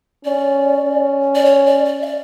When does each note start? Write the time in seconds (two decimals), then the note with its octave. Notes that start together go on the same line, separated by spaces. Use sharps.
0.25 C#4 D5
0.85 C#4
1.35 D5
1.45 C#5
1.66 D5
1.85 D5
2.02 E5
2.06 D5